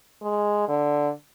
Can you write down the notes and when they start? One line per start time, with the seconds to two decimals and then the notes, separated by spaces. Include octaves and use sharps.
0.22 G#3
0.68 D3